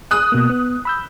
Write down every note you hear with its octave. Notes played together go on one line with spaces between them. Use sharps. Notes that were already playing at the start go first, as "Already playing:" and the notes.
D#6 F#6
B2 A#3
B3
B5 E6 G6